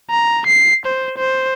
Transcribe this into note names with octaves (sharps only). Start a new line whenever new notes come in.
A#5
C7
C5
C5